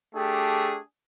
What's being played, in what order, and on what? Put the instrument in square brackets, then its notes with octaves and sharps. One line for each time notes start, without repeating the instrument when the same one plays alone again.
[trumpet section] A3 D4 G4 G#4